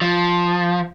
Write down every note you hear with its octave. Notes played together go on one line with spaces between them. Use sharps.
F3